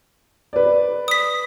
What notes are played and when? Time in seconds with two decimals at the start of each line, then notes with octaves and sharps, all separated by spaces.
0.53 B4 D5
1.08 D#6 B6